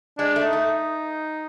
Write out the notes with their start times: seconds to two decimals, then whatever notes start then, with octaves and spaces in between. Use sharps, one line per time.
0.18 G#3 D4
0.36 A3
0.45 D#4
0.53 A3